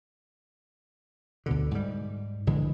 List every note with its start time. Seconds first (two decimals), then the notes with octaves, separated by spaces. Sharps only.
1.46 D2 B2 D3
1.71 G#2 G3
2.47 A#1 D3 E3 G#3